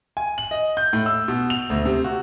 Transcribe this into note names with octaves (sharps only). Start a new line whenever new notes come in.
G#5
F#7
D#5
G6
A2
E6
B2
F7
D2
C3
F#4